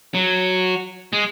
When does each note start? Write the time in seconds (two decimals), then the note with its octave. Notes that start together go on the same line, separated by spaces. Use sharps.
0.14 F#3
1.13 G#3